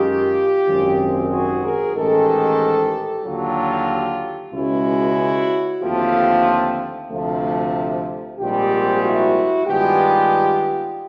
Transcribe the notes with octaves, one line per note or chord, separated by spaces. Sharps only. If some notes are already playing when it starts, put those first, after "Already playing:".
Already playing: F#2 D#3 G#3 F4 G4
G#1 F#2 D#3 G#3 C4
F#4 G#4
G#4 A#4
A1 G#2 D#3 G#3 G4 A4
D#2 D3 F#3 F4 G4
C#2 B2 G#3 C#4 E4 F#4
D#2 D3 F3 A3 C4 F4 G4
D2 C3 F3 A3
A#1 G#2 D#3 G3 C4 F4 G4
E4 F#4
G2 D#3 G#3 B3 D4 F4 G4